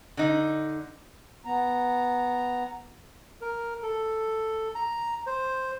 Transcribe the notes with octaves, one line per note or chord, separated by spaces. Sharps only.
D3 D#4
B3 A#5
A#4
A4
A#5
C5